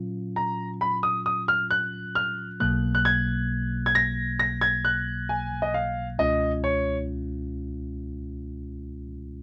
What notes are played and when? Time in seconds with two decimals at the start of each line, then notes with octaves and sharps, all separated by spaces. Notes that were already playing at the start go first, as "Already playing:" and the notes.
Already playing: A#2 F#3 C#4 F4
0.36 A#5
0.81 B5
1.03 D#6
1.26 D#6
1.48 F6
1.71 F#6
2.15 F6
2.60 B1 B2 F#3 A#3 F#6
2.95 F#6
3.05 G#6
3.86 G#6
3.95 A#6
4.39 A#6
4.61 G#6
4.85 F#6
5.29 G#5
5.62 D#5
5.74 F5
6.19 C#2 B2 G#3 C#4 F4 D#5
6.64 C#5